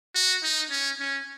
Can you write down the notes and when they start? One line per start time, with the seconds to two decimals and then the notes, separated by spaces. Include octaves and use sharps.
0.15 F#4
0.44 D#4
0.71 C#4
1.00 C#4